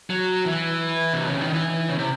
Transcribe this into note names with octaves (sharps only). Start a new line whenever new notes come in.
F#3
E3
C3
C#3
D#3
E3
C#3
C3